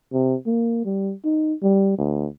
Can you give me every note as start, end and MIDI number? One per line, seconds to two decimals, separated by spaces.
0.13 0.35 48
0.46 0.80 58
0.85 1.12 55
1.24 1.53 63
1.62 1.98 55
1.98 2.26 38